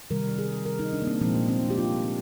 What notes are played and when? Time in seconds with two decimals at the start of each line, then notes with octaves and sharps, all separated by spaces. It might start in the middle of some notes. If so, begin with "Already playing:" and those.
0.10 C3 D#3 G3 A#4
0.39 G#4
0.66 A#4
0.79 D#4
0.93 D4
1.02 A#3
1.07 C4
1.21 A#2 F3 G#3 C4
1.36 A#3
1.49 C4
1.64 D4
1.70 G4
1.78 F4